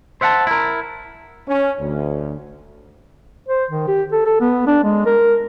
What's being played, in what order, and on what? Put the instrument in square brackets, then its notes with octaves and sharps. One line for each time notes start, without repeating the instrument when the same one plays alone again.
[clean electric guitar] C5 E5 F#5 G5 A5
E4 A#4
[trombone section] C#4
D2
[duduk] C5
D#3
G4
A4
A4
B3
D4
G#3
A#4